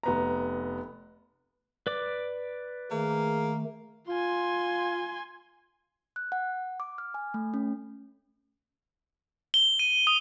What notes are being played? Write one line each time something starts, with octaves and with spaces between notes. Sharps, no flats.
F1 B3 A#5
B4 D5 D6
D#3 A3 A#3 G#4
F4 G#5 C6
F#6
F#5
D6
F6
G#5
A3
C#4
G7
D#7
D#6